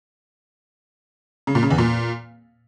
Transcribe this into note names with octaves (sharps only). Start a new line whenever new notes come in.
C#3
A#2
C#3
E2
A#2